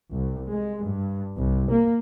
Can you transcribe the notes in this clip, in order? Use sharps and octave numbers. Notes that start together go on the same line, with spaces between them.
C2
G#3
G2
C2
A#3